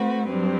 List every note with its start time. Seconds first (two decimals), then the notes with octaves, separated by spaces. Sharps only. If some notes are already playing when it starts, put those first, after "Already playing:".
Already playing: A3 C4 F#4 B4
0.28 G2 F#3 C4